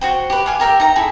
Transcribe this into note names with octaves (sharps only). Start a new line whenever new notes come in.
F#4 C5 G5
G4 B4
F5 G#5 D6
G4 A#4 E5 G5
D#4 G5 A#5
E4 G#4 A4